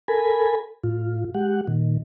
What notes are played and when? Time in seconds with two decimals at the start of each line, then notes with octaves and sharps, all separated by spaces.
0.08 A4 A#4 G#5 B5
0.84 A2 F4
1.34 G#3 G4 F#5
1.67 A#2 D#3